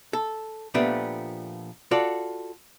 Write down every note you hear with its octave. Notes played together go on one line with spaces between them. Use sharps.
A4
A#2 F3 A3 B3 D4 G4
F4 F#4 A4 D5